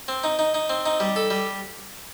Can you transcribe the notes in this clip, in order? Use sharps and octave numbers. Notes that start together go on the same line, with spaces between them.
C4
D#4
D#4
D#4
C4
D#4
G3
A4
G3